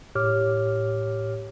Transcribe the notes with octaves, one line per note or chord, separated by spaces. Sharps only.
A2 G4 C#5 D6 F6